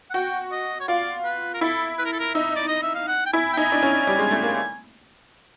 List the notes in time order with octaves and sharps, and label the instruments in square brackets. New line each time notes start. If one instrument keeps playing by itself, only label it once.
[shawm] F#5
[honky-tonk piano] F#4 [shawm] G5
[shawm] D#5
C#5
[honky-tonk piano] F4 [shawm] D5
[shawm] B4
A#4
[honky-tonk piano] E4 [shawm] A4
[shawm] B4
A#4
A4
A#4
[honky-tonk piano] D#4 [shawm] E5
[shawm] D5
D#5
E5
F5
F#5
G5
[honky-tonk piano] E4 [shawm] G#5
[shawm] G5
[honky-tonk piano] D#4 [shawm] G#5
[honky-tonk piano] D4
C#4
G3
G#3
A3
A#3